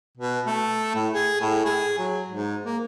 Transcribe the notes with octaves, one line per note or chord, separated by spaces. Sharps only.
B2
A3
A2
G#4
A2
G#4
F#3
G#2
A#3